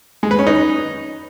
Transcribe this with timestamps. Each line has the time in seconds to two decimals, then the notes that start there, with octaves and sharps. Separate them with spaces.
0.23 G#3
0.31 B4
0.39 C#4
0.47 D#4